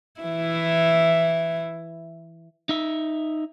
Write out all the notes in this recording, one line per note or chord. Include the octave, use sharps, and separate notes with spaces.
E3 E4
D#4 E5